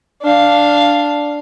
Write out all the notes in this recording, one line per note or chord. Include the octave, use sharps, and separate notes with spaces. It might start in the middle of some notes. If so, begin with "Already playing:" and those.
D4 F5